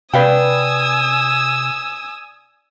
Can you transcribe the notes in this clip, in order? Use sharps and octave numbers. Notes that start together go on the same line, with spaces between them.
C3 D4 B4 F5 G5 G#5 D#6 E6